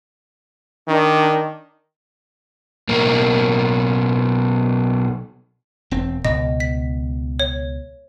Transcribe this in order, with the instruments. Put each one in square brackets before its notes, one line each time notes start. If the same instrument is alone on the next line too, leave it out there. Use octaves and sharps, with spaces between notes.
[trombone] D#3 [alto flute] D4
[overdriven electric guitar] B1 A#3
[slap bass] E1 C4
[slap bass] C#2 B2 [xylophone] D#5
[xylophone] B6
C#5